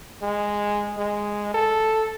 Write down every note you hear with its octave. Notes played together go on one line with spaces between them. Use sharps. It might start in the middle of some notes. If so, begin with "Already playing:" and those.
G#3
G#3
A4